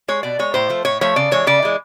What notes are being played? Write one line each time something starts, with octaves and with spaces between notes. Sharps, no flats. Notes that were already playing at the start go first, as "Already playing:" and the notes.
G#3 C#5
B2 D5
G#3 C#5
A2 C5
F3 A3
A2 C#5
F3 A3 C#5
C#3 D5
E3 G#3 C#5
C#3 D5
E3 G#3